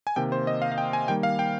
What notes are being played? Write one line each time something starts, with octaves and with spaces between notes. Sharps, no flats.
G#5
C3 D#3 A#3 G5
C5
D#5
F5
F5
G5
G#5
D#3 G3 A#3 G5
F5
G5